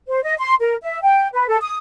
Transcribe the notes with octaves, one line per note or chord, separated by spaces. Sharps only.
C5
D#5
C6
A#4
E5
G5
B4
A4
D#6